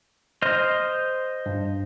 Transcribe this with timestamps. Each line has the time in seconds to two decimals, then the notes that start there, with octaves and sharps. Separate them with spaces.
0.42 C5 D#5 F6
1.46 G2